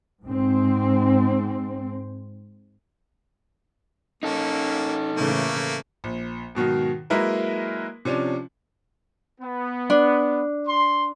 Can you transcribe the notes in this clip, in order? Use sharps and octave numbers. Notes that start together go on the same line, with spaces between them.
G#2 C4
A#3 C#4 D#4 A4
A2 C#3 E3 A3 A#3
A#1
G#2 B2 D#3 F#3
F#3 G#3 A#3 E4 A#4 B4
C3 F3 C#4 D4
B3
D4
C6